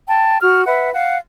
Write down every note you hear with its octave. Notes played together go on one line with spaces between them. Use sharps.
G5 A5
F#4 F6
B4 E5 F#5
F5 F#5